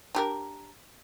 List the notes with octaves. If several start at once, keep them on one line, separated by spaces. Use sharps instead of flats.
D4 G4 A#4